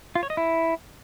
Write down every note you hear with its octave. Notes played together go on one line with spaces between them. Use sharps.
F4
C#5
D#5
E4